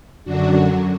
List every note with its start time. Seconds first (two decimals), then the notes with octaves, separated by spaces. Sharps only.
0.24 F#2 D3 F#3 D4 F#4